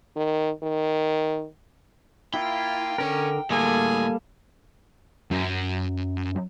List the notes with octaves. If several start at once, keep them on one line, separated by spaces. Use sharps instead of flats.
D#3
D#3
A#3 E4 F4 G5
D3 C#4 A#4
D2 A2 G3 A#3 G#4 A4 G#5
F#2